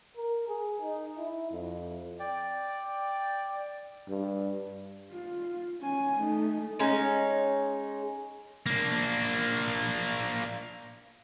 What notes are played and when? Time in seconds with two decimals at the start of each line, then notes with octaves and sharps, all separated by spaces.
0.16 A#4
0.48 G#4
0.81 D#4
1.18 E4
1.51 F2
2.20 D5 G5
4.09 G2
5.11 F4
5.80 C#4 G#5
6.19 A3 D#4
6.79 G#3 C#4 D#4
8.66 A#3 D4